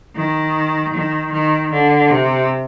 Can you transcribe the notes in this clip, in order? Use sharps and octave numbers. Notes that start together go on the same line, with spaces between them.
D#3
D#3
D#3
D3
C3